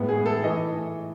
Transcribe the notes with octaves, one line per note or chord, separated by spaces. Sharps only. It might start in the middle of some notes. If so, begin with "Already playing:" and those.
Already playing: A2 G#3 B3
G#4
A4
E3 A3 D#5